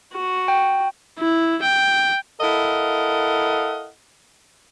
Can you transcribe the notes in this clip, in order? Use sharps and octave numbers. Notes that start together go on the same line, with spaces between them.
F#4
G5
E4
G5
E4 A4 A#4 D#5 F5 F#5